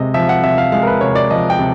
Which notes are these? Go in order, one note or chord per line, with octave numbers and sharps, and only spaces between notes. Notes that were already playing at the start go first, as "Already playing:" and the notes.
Already playing: C3 G#3 D#5
F3 E5
F#5
C3 E5
F5
G#3 F5
A#4
B4
C3 C#5
D5
F3 D#5
G5
C3